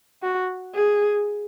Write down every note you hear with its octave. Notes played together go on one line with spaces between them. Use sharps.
F#4
G#4